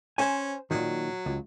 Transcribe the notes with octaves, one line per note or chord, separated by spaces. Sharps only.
C#4 C5 G#5
A#2 D#3 F#3
C#2